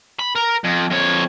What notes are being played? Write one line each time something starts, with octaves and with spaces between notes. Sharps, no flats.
B5
A#4
F2
F2 C#5